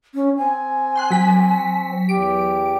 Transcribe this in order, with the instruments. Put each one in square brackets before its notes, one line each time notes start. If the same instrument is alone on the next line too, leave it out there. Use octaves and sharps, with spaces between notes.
[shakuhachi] C#4
[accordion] C4 [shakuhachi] G#5
[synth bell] G5 C6 F#6
F#3 B6
[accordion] E2 G4 [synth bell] D7